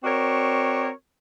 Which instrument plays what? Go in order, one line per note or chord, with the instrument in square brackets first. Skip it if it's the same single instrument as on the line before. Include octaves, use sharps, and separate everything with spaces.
[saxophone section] C4 F#4 A#4 C#5 D5